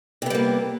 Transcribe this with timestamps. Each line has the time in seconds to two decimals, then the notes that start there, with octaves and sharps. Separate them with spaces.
0.22 C3
0.26 B3
0.30 G3
0.35 A#3